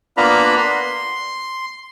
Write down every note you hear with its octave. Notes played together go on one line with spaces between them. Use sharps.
A#3 B3 D4 F4 A#5 B5
C6